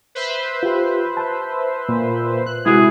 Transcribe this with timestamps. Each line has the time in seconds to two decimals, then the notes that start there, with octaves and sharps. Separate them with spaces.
0.15 B4 C5 E5
0.63 F4 G4
1.17 A5 F#6
1.88 A#2
2.46 F#6
2.66 C3 G#3 E4 F#4 G#4 F#6